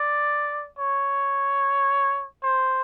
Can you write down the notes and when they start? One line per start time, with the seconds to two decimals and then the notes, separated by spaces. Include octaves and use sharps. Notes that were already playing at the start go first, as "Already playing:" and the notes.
Already playing: D5
0.78 C#5
2.43 C5